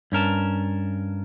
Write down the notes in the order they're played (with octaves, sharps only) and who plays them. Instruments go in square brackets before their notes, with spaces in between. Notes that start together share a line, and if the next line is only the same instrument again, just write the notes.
[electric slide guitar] G2 C#4 A#4 A5